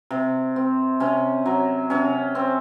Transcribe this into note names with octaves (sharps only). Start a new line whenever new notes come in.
C3
C4
C3 C#4
F#3
C3 C#4
C4